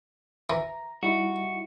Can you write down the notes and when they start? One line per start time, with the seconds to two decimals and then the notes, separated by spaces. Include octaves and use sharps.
0.50 E3 A#5
1.03 G3 D#4 E4 F#4